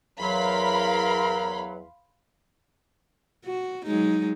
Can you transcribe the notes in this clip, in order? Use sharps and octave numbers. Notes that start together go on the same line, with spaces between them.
E2 F#3 A#4 F5 B5 C6
F#4
F#3 G#3 D#4